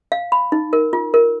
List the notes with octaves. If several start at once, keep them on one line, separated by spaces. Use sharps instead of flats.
F5
B5
D#4
A#4
F4
A#4